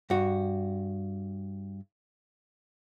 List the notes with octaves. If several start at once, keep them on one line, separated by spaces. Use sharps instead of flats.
G2 F#4